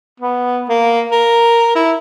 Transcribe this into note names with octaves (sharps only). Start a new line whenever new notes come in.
B3
A#3
A#4
E4